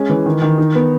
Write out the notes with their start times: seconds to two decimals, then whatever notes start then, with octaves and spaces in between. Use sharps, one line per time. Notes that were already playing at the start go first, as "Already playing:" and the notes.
Already playing: G#3 C#4
0.10 E3
0.26 D#3
0.42 D#3
0.58 D#4
0.75 B3